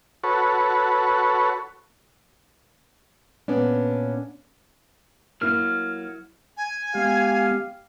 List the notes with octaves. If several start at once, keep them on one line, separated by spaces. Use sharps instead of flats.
F#4 A4 B4 C#5
A#2 B3 C#4 D4
F#3 A#3 E4 F6
G#5
G#3 B3 G4 F5